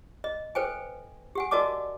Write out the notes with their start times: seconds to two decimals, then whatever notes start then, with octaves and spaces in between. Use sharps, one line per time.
0.24 D#5
0.55 A4 B4 C5 G5 G#5
1.35 G4 F#5 G#5
1.51 F#4 A#4 D5 D#5 A5 D6